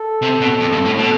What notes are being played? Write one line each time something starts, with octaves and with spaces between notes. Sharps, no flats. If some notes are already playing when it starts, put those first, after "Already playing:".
Already playing: A4
C3
B2
F2
G2
A2
B2 A4